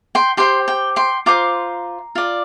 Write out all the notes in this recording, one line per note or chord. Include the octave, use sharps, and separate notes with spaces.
G5 C6
G4 C5 G5 C6
G5
G5 C6
F4 C5 A#5 D6
F4 D5